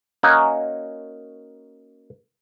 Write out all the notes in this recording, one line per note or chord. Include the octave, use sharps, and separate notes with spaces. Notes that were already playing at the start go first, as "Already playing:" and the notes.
A#3 C#4 D#4 F#4 G#5